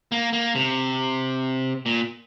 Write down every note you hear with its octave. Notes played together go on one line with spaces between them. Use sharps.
A#3
A#3
C3
A#2